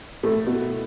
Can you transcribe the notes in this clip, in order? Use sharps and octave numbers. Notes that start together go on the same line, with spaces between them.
A2 A3
B2 B3